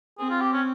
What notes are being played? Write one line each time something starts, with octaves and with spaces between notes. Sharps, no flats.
C4 G#4
F4
G4
C#4